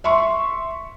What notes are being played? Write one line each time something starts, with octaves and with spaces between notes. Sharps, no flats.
E5 C6 C#6